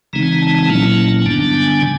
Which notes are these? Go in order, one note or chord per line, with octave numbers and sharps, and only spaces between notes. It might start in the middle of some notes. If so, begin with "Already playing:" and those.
C#3 E3 G#3 C4 D#4 A#5
A5
A#5
A5
A5
A#2 F#3 A#3 C#4 E4 A5
G#5
G2 D3 G3 B3 D4 A5
A5
G#5
C#3